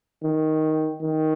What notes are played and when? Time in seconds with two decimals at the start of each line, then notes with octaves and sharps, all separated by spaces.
0.24 D#3
1.02 D#3